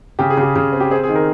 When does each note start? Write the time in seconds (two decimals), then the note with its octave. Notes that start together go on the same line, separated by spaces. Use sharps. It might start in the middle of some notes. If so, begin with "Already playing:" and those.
0.19 C#3 G4
0.30 G#4
0.37 C#3
0.42 G4
0.56 C#3
0.73 C4
0.80 G4
0.91 C4 G#4
1.03 G#4
1.09 D#3
1.16 A#4